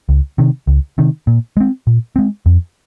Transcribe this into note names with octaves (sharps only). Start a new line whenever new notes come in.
C#2
C3 D#3
C#2
C3 D#3
A#2
G#3 C4
A#2
G#3 C4
F2